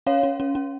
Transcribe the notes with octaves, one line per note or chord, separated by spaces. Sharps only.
C#4 C#5 F5
C#4
C#4
C#4